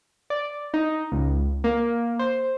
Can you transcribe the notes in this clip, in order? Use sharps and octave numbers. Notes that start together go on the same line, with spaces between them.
D5
D#4
C#2
A#3
C5